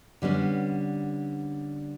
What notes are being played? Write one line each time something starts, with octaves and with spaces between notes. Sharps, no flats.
D3 G3 B3 C#4